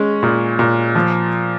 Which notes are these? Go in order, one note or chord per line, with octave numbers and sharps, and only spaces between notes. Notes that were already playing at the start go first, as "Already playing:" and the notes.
Already playing: G#3 C#4
A#2
A#2
F3